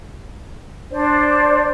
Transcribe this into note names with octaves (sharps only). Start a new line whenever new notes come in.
D4 C5 D5